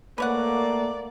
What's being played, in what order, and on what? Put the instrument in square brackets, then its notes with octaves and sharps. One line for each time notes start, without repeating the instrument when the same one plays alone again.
[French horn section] A3 A#3 [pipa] B4 C#5 F#5 [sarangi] D5